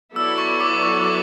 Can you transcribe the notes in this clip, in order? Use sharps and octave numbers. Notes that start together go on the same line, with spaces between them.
F#3 B3 E4 A4 D5 E6
C#6
D6
C#6
D6